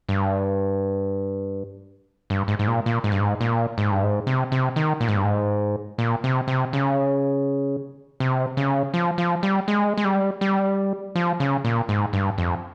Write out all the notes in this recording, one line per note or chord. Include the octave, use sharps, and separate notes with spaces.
G2
G2
G#2
G#2
A#2
A#2
G#2
G2
G#2
A#2
G#2
G2
G#2
C3
C3
D#3
A#2
G#2
G2
G#2
A#2
C3
C3
C#3
C3
C#3
F3
F3
G3
G#3
G#3
G3
G3
F3
C#3
A#2
G#2
G2
F2